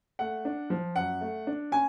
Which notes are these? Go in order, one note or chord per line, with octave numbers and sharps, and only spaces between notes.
A3 F#5
D4
F3
F#2 F#5
A3
D4
C#4 G#5